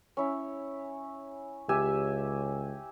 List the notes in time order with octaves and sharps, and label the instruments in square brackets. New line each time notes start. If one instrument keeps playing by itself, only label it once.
[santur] C#4 E4
[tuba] C#2 [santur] G4 E5 G#5